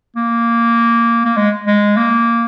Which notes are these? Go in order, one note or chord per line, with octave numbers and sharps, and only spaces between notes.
A#3
A#3
G#3
G#3
A#3